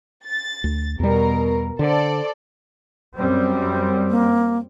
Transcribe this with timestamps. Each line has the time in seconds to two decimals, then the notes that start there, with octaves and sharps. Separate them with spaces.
0.24 A6
0.64 D2
1.00 E2 B2 G3 A#4
1.79 D3 A4 C5 D5
3.16 F#2 G3 C4
4.10 A#3